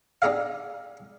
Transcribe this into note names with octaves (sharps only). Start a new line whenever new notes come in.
D4 D#4 G4 G#4 D#5 F5